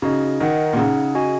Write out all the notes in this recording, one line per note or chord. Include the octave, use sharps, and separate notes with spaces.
C#3 D#4 F#4 D#5
D#3 D#4 A#4 D#5 F#5
A#2
C#3 D#4 G#4 F#5
F#4 D#5 G#5